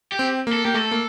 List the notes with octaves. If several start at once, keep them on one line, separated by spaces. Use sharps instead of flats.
G4
C4
A#3
A4
A#3 G4
A3 A4
A#3